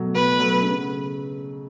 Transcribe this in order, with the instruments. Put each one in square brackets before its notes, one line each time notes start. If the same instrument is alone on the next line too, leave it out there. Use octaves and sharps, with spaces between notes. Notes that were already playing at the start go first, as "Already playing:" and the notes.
Already playing: [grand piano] B2 F#3 A3
[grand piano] B2 [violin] B4
[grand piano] F#3 A3
C#3